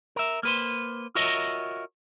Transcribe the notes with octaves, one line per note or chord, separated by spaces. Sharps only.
A#4 E5
A#3 B4 C5
F4 F#4 A#4 C#5 D#5 E5